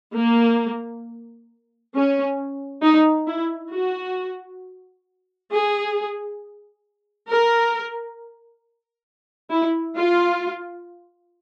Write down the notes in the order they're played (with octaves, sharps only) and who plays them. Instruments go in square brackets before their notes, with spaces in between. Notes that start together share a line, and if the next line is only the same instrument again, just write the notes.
[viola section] A#3
C#4
D#4
E4
F#4
G#4
A#4
E4
F4